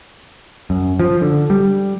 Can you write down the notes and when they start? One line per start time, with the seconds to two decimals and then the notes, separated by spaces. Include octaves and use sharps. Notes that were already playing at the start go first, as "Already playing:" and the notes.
0.70 F#2
1.00 F3
1.21 D3
1.50 G3